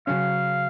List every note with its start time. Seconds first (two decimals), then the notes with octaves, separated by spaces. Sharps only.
0.07 C#3 F#3 C#4 F5